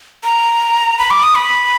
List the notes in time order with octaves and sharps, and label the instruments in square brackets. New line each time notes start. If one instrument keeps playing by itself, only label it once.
[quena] A#5
B5
D6
D#6
B5